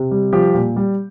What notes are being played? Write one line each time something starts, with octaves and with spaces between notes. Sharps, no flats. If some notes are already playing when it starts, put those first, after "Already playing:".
Already playing: C3
G3
F3 G4
A#2
G3